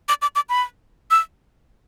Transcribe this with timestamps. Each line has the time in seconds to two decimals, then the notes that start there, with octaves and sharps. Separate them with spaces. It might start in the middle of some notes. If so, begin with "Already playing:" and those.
0.09 D6
0.22 D6
0.35 D6
0.49 B5
1.11 E6